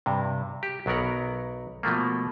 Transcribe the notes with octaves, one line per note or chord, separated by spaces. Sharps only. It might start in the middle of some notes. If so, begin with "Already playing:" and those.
G2 C3
G4
B1 F#3 B3 A#4 F#5
B2 F3 A3 A#3